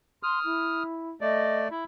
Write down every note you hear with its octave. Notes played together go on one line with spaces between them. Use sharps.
C6 D#6 F6
E4
A3 D5 D#5
E4